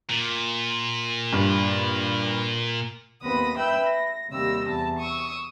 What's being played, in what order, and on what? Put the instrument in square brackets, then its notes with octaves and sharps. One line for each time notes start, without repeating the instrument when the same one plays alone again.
[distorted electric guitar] A#2
[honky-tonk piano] G2
[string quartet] D#2 B3 C4 B4 D#6 A#6
B4 E5 G5 B5 E6 G6
A#6
D#2 C3 G3 E6 A#6
E2 A5
C#6 D#6 E6